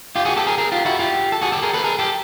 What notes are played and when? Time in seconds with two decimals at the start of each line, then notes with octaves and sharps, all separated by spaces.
0.16 F4 G4
0.25 F#4 G#4
0.36 G4 A4
0.47 G#4 A#4
0.58 G#4 A#4
0.72 F4 G4
0.85 E4 F#4
0.99 F4 G4
1.32 A4
1.42 F#4 G#4
1.52 G4 A4
1.63 G#4 A#4
1.74 A4 B4
1.84 G#4 A#4
1.99 G4 A4